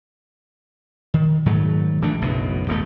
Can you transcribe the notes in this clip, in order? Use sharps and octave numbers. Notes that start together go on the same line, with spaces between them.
D#3
G#2 D#3 F#3 A3
A#1 E3 A3 D4
F#1 B1 B2
D#1 B2 A3